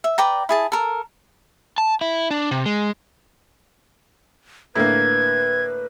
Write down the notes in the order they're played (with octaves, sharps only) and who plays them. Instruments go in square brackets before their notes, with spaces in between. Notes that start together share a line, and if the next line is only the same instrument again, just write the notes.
[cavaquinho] E5
B4 D5 G5 A#5
E4 G#4 A5
A4 A#4
[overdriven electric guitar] A5
E4
D4
C3
G#3
[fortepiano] A2 D3 A#3 [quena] B4 [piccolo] G#6